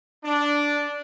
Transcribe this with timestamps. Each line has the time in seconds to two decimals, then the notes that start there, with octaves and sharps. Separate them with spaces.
0.24 D4